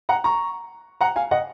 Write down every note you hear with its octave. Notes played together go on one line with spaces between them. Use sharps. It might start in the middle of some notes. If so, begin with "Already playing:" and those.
F#5 A#5
A#5 C#6
F#5 A#5
F5 G#5
D#5 F#5